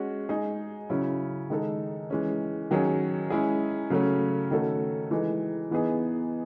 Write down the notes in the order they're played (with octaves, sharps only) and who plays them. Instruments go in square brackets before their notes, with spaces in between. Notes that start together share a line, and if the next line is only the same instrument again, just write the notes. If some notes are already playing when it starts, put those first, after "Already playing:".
Already playing: [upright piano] G#3 C#4 F#4
G#3 D#4 G#4
C#3 F#3 C#4 E4
D#3 G#3 D#4 A4
E3 G#3 C#4
D#3 F#3 C#4 G#4
G#3 C#4 E4 G#4
C#3 F#3 A3 C#4
D#3 A3 C#4 F#4 A4
E3 G#3 D#4
E3 B3 D#4 G#4